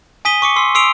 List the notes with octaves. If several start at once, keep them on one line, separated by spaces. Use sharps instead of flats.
G#5 D#6 B6 D#7 G7
C#6 D6 C#7
C6 E6 C7
C6 D#6 E6 C7 D7 F7